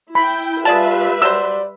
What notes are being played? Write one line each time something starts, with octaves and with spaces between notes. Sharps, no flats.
E4 G5 B5
G3 F4 G#4 B4 D5 E5 A5
F#3 C5 D5 E6